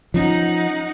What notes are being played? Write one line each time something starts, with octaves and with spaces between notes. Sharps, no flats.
F3 C#4 D#4 F#5